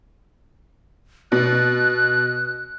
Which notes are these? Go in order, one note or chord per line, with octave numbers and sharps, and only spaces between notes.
B2 F#6